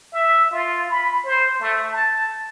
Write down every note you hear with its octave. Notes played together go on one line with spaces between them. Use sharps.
E5
F4
B5
C5
A3
A5